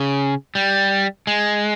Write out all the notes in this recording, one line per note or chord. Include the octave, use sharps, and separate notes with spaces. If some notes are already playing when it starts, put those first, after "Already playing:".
Already playing: C#3
G3
G#3